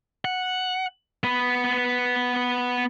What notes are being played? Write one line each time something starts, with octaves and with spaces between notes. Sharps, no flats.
F#5
B3 B4